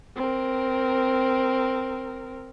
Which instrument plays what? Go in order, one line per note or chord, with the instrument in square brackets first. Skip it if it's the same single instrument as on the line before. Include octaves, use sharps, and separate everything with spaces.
[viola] C4 A#4